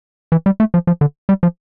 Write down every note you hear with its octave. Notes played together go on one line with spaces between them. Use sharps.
E3
G3
A3
F3
F3
D3
G3
F3